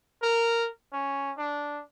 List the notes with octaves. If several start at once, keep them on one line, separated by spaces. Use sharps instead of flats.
A#4
C#4
D4